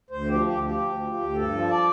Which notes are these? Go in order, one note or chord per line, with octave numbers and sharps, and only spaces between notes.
D2 C5
F3 G4
D2 G4
F3 G4
D2
F3
D2
G2 A4
F3
D5